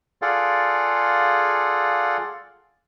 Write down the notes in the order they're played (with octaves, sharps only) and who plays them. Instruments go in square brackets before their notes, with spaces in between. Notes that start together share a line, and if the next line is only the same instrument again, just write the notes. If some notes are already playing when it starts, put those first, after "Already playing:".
[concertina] F4 G#4 A4 D5 F5 F#5